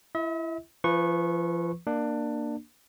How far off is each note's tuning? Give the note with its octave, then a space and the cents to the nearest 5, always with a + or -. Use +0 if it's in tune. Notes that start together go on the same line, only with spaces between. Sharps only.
E4 +20 E5 -45
F3 -35 B4 +0 C#6 -20
A#3 +0 D4 +20